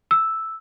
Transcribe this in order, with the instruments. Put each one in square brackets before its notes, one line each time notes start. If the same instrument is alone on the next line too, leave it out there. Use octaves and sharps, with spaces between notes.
[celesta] E6